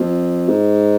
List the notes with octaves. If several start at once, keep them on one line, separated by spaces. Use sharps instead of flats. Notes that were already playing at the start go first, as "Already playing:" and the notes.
Already playing: F2
G#2